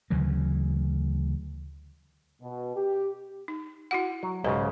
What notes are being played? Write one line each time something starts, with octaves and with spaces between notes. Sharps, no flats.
D2 C#3 E3 F#3
B2
G4
D#4
E4 F#4 F#5
F#3
B1 G#2 C#3 G4 C5